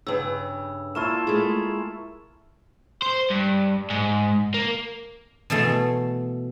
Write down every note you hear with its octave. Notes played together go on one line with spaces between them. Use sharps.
G2 C#3 E6
A#3 E4 F4 A5 C#6 E7
G#3 A3
C5
G2
G#2
A#3
B2 E3 A3 A4 C6